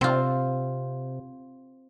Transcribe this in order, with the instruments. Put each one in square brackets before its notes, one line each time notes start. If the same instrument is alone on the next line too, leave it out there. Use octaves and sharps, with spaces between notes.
[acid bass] C3 [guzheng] C4 F4